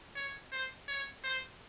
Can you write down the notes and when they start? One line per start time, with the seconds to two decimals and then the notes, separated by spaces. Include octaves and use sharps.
0.16 C#5
0.52 C5
0.88 C#5
1.24 C5